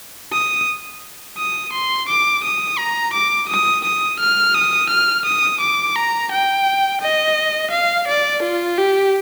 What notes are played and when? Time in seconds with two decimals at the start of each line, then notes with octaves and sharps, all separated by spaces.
0.33 D#6
1.38 D#6
1.73 C6
2.09 D6
2.44 D#6
2.78 A#5
3.14 D6
3.49 D#6
3.85 D#6
4.20 F6
4.54 D#6
4.90 F6
5.26 D#6
5.61 D6
5.96 A#5
6.32 G5
7.02 D#5
7.71 F5
8.08 D5
8.43 F4
8.78 G4